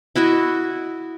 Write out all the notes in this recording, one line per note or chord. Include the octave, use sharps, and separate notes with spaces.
E4 F#4 D#5 E5